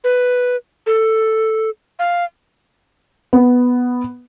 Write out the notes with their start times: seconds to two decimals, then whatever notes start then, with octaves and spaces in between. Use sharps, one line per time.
0.04 B4
0.86 A4
1.99 F5
3.33 B3